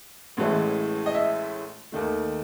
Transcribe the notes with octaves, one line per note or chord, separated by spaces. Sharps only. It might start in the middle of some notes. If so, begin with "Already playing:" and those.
A1 A2 E3 G#3
D#5
E5
D#2 D#3 A3